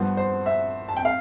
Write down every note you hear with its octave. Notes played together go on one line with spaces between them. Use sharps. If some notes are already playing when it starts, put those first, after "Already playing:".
Already playing: G2 F3 B3 C5
C5
E5
A5
G5
F5